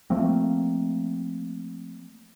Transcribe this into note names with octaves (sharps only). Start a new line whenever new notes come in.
F3 A3 A#3 C4